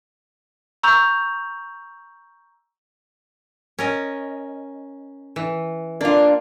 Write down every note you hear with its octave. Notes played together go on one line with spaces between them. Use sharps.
A#5 C#6 E6 G6 F7
C#4 A#4 D#5
E3
A#3 D4 F4